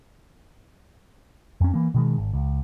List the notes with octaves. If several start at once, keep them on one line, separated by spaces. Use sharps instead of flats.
F2 C#4
E3 A#3
B2 D#3 G#3
G#1
C#2